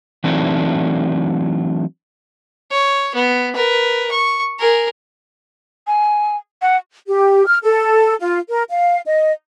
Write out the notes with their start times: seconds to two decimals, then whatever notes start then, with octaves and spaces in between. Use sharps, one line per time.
0.24 E3 F#3 A3 C4 D4 D#4
2.71 C#5
3.15 B3
3.55 A#4 B4
4.11 C#6
4.59 G#4 A#4
5.87 G#5
6.62 F#5
7.08 G4
7.46 F6
7.63 A4
8.21 F4
8.50 A#4
8.70 F5
9.06 D#5